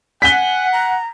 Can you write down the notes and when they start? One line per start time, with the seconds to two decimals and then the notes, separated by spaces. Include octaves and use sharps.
0.22 F#5 G#5 B6 G7
0.72 A#5